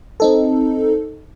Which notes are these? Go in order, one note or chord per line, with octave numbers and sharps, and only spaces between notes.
C4 D#4 A4